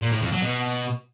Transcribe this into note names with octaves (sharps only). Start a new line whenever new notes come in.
A#2
A2
F2
F#3
B2